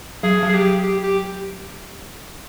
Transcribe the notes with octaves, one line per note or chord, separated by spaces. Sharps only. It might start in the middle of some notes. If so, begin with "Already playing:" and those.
F#3 G#4
F#3
G#4
G4
G4
G4